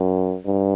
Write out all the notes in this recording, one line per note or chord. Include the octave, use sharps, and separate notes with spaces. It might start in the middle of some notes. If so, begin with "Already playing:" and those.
Already playing: F#2
G2